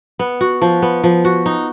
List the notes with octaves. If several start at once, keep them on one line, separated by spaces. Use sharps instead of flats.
B3
F#4
F3
B3
F3
F#4
D#4